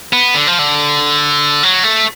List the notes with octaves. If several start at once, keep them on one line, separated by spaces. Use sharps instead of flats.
B3
D3
F3
D3
F#3
A3